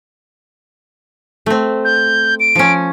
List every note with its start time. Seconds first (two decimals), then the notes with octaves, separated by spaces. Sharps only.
1.46 A3 C4
1.85 G6
2.40 D7
2.55 F3 C#4